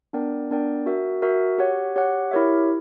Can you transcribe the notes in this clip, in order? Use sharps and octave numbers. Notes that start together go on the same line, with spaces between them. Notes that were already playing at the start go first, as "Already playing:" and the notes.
B3 D4 A#4 D5 G5
B3 D4 A#4 D5 G5
F#4 A#4 E5
F#4 A#4 E5
G4 C#5 F#5
G4 C#5 F#5
E4 G4 A#4 C#5 E5